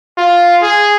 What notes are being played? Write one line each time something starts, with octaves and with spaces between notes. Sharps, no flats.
F4
G#4